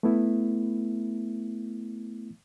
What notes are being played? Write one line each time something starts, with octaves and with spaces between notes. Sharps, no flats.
A3 B3 E4